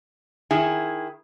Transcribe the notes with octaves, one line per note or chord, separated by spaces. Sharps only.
D#3 E4 G#4